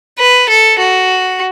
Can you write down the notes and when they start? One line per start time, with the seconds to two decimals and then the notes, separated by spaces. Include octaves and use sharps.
0.18 B4
0.49 A4
0.78 F#4